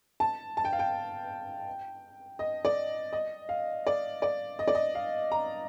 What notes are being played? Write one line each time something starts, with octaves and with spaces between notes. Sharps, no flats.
A5
A5
G5
F5
G5
D#5
D5
D#5
F5
D5
D5
D#5
D5
D#5
F5
A#5